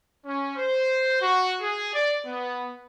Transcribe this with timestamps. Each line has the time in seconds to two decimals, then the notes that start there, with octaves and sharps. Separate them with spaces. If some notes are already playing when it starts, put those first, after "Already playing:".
0.26 C#4
0.56 C5
1.21 F#4
1.61 G#4
1.94 D5
2.26 B3